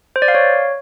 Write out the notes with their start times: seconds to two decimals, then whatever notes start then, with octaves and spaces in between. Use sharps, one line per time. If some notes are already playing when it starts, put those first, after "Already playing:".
0.16 C5
0.22 D5
0.28 F5
0.35 C#5